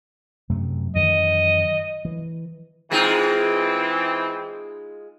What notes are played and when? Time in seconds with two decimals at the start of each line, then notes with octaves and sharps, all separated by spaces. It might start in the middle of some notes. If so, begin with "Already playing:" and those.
0.50 F#2 C3 A3
0.95 F#2 D#3 E3 D#5
2.05 E3
2.92 E3 G#3 C4 D#4 F4